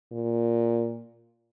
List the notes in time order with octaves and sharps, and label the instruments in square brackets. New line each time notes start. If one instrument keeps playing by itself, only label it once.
[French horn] A#2